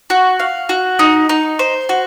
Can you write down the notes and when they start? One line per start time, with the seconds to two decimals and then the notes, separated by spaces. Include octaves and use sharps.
0.10 F#4
0.40 F5
0.69 F#4
0.99 D#4
1.29 D#4
1.59 C5
1.89 F#4